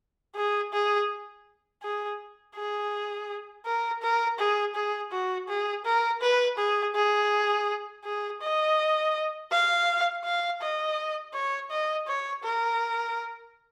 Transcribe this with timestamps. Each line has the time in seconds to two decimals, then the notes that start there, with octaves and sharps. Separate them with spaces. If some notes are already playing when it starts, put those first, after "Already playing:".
0.36 G#4
0.73 G#4
1.83 G#4
2.56 G#4
3.66 A#4
4.02 A#4
4.39 G#4
4.75 G#4
5.12 F#4
5.48 G#4
5.85 A#4
6.22 B4
6.58 G#4
6.95 G#4
8.04 G#4
8.41 D#5
9.51 F5
10.24 F5
10.61 D#5
11.34 C#5
11.71 D#5
12.07 C#5
12.43 A#4